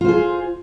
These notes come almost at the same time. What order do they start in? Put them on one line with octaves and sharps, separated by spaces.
F4 C5 G#4